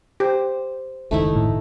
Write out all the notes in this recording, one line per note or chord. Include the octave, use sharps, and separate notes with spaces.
G4 C5
F#1 C#2 D#3 A3 D#4 E4
A2